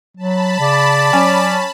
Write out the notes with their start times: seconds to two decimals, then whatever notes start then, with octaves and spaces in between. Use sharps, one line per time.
0.17 F#3 A5 B5
0.59 C#3 D5
1.13 F#3 C#4